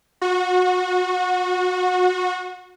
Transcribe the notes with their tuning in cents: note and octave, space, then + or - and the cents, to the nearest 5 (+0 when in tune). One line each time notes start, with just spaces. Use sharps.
F#4 -25